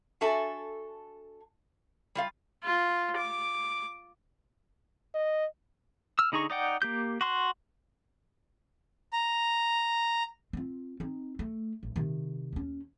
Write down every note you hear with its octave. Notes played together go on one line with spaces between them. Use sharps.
D4 F#4 A4 E5 G#5
G3 F4 F5
F4
D6
D#5
E6 F6
D3 D#4 G#4 A#5 C#6
D#4 D5 F#5 G5
A#3 G4 G6
F#4 C6 F#6
A#5
C4 F4
C4 D#4
A3
A1
C3 D#3
D#2 C#4